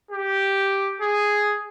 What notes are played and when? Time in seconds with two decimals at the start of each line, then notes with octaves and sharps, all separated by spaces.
0.11 G4
1.01 G#4